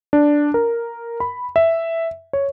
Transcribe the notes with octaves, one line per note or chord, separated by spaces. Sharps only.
D4
A#4
B5
E5
C#5